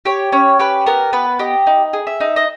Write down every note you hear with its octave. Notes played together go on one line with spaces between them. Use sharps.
G4 C#5
C#4 C#5
G4 B4
B3 A#4
B3 B4
G4 D#5
D#4
G#4
E5
D#4
D#5